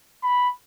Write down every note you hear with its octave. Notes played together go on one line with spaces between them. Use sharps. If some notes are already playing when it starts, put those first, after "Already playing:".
B5